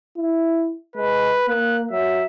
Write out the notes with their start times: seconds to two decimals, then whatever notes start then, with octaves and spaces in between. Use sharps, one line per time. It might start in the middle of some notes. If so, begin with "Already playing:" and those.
0.17 E4
0.96 G#3 B4
1.48 A#3 F#6
1.91 F#3 E5